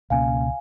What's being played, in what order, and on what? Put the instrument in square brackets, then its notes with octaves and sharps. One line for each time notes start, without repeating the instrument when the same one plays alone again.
[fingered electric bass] C#2 B2 A#3 C#4 [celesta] F5 G#5